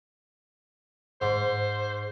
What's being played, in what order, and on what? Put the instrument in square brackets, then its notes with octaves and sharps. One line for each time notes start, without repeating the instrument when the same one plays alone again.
[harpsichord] G#2 [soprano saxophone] C5